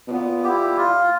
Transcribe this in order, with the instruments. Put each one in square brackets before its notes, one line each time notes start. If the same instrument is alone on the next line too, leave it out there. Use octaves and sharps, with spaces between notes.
[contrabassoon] B2
[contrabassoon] A#2 [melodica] B3
[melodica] E4 G4
F4